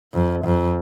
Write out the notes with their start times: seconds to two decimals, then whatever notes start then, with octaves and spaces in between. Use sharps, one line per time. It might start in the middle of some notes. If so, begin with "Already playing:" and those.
0.13 F2
0.45 F2